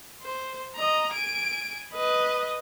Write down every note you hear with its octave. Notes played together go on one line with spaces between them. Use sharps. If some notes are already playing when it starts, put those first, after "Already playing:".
C5
D#5 A#5
G#5 D7
B4 D#5